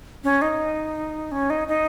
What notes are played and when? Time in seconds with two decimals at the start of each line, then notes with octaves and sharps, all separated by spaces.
0.24 C#4
0.42 D#4
1.32 C#4
1.50 D#4
1.68 D#4